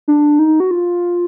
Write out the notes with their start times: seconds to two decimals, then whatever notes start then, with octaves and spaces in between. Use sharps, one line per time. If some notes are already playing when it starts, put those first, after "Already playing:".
0.08 D4
0.39 D#4
0.60 F#4
0.71 F4